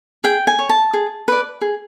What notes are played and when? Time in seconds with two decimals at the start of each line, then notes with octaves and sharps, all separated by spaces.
0.24 G#4 G5
0.47 G#5
0.59 C#5
0.69 A5
0.93 G#4
1.28 B4 D5
1.61 G#4